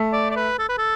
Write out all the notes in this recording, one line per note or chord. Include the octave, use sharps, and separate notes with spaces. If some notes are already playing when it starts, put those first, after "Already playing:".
Already playing: A3
D5
D5
B4
A4
B4
A4